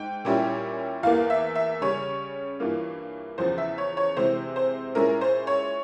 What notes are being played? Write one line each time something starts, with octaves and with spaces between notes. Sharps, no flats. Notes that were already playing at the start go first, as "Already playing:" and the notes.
Already playing: G#2 G5
A#2 G3 C#4 E4
E2 E3 A#3 F5
E5
E5
C#3 G3 C#4 C#5
G2 E3 A#3 F4
E2 C#3 F3 C5
E5
C#5
C#5
C3 E3 G#3 C5
C5
A#2 G#3 C#4 E4 A#4
C5
C#5